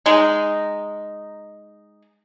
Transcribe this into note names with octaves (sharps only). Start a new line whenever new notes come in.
G#3 D#4